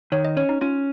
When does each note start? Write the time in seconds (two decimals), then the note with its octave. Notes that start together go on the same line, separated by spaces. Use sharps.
0.12 D#3 C#5
0.25 D#5
0.37 C#4 C#5
0.49 D#4
0.61 C#4 F4